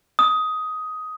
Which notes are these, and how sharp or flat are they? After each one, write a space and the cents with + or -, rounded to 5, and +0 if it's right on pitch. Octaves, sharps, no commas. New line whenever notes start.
D#6 +10